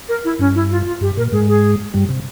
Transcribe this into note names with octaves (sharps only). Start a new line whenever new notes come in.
A#4
E4
G2 C#4
E4
F4
F4
G2 G4
A#2 A#4
G#2 G#3 G#4
G#4
G2 G3
C3